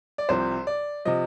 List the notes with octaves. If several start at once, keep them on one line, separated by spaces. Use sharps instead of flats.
D5
C2 C3 F3 C5
D5
C3 F3 D#5